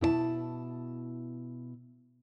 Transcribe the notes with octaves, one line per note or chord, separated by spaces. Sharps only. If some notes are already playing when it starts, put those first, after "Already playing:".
B2 E4 C#5 A5